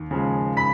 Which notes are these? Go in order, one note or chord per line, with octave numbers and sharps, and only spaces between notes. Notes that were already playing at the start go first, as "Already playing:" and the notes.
Already playing: D#2
C#3 F3 G#3
B5 B6